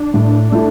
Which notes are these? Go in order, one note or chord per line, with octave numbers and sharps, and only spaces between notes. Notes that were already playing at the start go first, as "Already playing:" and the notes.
Already playing: D4
A2
A3 E4